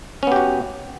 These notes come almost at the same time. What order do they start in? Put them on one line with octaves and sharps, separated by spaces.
C#4 B3 G4 F#4